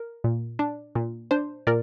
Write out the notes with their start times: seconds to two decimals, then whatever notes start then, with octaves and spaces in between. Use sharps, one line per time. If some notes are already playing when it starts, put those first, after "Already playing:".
Already playing: A#4
0.24 A#2
0.59 D4
0.95 A#2
1.31 D4 C5
1.67 A#2 A#4 D5